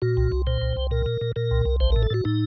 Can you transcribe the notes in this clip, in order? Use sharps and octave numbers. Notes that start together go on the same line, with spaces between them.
A#2 F#4
C2
C2
A#2 C5
C2
C2
A#2 A#4
A#2
A#2
A#2 A#4
C2
C2
A1 C5
A2 A#4
A4
A2 F#4
A2 D#4